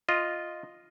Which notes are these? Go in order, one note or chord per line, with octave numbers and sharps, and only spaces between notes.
F4 D#5